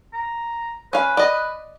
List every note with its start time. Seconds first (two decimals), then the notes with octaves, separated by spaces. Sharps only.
0.14 A#5
0.93 C#4 B4 F5
1.17 D5 D#5